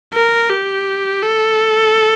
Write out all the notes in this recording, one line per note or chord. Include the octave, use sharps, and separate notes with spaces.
A#4
G4
A4